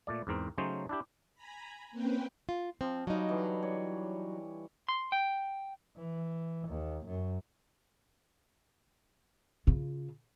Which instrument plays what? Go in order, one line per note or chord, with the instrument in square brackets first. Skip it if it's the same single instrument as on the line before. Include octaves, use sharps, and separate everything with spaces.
[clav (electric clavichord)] A#2 A3 D5
E2 G#2 C4 A#4
C#3 F#3 A3 C#4 D#4 C5
D4 E4 G4
[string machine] G#5 A#5 B5
A#3 C4 C#4 B4 G5
[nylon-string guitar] F4
[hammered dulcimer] F3 [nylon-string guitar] C4
[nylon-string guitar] F#3 D#4 [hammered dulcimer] G3 D#5 F5
[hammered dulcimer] D3 E3
C#5 D5
[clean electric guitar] C6
G5
[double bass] E3
D#2
F#2
[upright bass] C#3 F4